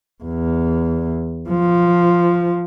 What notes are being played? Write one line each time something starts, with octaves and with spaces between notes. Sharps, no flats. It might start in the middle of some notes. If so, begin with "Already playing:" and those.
E2
F3